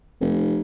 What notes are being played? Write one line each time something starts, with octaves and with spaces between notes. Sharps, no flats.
F1